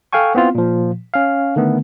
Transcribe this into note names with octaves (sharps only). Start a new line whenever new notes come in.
A4 F5 G5 G#5 C#6
B3 C4 E4 F4
A#2 F3
C#4 F5
D3 D#3 A3 B3